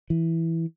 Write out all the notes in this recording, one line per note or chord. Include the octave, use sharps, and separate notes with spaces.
E3